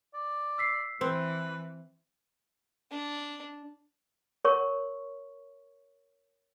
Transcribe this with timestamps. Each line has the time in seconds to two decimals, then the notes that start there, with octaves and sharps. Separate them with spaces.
0.14 D5
0.58 E6 B6 C7
1.01 E3 C4 B4
2.91 D4
4.45 A#4 C#5 C#6